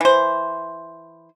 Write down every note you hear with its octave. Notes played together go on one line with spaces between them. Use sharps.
E3 C5